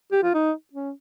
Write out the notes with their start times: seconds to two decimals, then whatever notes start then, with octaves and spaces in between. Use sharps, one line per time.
0.12 G4
0.23 F4
0.34 D#4
0.73 C#4